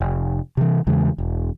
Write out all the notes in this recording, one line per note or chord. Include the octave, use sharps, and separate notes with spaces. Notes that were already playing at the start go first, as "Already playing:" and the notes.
F1
C3 E3
E2 C#3 E3 G#3
E1